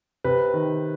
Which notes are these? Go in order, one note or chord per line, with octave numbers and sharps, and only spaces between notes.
C3 B4
D#3